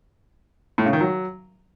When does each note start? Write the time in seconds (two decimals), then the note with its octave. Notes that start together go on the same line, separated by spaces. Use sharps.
0.78 A2
0.86 C#3
0.93 D#3
1.01 F#3